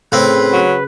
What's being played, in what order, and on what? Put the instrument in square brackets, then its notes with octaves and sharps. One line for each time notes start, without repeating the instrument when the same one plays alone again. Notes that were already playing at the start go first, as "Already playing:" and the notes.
[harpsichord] A2 C4 [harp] C#3 [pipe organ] B4
[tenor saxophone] F#3